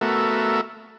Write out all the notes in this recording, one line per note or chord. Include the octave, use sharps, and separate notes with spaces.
A3 B3 F#4 A4 A#4 E5